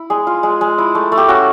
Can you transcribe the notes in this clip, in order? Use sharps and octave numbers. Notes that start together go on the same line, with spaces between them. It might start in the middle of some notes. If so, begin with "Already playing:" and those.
Already playing: E4
G#3 G#4
F4
G#3
G#3
E4
A3
A3
G4
C#4 F#4